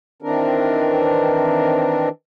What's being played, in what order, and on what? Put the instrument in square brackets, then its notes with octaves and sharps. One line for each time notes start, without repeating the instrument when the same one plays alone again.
[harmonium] D#3 E3 C4 D4 A#4